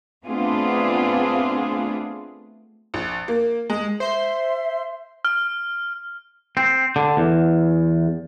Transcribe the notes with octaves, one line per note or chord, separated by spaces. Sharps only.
A3 B3 C4 D4 F4 G#4
A#1
A#3
G#3
C5 E5 C6
F6
C4
D3
E2